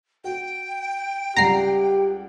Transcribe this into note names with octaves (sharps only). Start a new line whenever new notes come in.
F#4 G5
C#2 G3 G4 F#5 A#5 C7